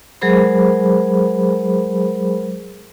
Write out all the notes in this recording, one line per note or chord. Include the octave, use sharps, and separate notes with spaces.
F#3 G#3 G#4 A#4 C5 B5